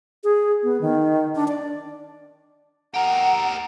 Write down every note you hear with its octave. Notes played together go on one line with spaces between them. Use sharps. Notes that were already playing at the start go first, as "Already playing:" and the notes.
G#4
B3
D#3
D4
D5
G4 A#4 F#5